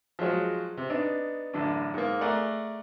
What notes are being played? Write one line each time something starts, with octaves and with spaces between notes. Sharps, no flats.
F3 F#3 G#3 F#4
C3
B3 D4 D#4
A1 F#2 D3 D4
G#2 A#3
A3 G#4 A#4 D5 F#5